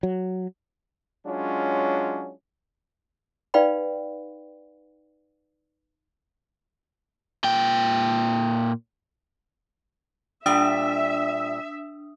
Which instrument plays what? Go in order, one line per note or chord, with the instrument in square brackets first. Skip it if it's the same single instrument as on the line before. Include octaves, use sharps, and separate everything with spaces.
[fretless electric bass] F#3
[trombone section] F#3 G#3 C#4 D4 F4
[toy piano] D#4 B4 D5 F5 G5 B5
[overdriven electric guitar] A#2 G5
[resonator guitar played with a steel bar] A#2 G3 D5 [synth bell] D4 D#6 [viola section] E5